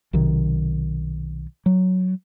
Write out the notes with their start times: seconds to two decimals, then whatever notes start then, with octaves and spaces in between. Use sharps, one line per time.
0.13 B1 C3 D#3
1.66 F#3